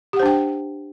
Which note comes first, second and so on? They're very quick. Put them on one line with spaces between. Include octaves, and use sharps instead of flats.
G4 F#5 C5 D4 G5